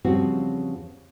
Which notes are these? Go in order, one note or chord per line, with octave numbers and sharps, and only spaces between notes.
E2 C#3 F3 G3 C4 F#4